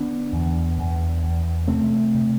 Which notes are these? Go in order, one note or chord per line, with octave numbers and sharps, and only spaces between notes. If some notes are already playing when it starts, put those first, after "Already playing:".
Already playing: D3 B3 D4
E2
E2
E2
C3 A3 C4
C3